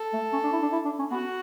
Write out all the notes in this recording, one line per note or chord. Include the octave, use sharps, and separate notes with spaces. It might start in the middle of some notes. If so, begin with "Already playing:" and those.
Already playing: A4
A3
C#4
D4
E4
D4
E4
D4
C#4
B3 F#4